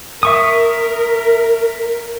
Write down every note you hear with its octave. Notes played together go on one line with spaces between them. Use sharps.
A#4 E5 C#6 D#6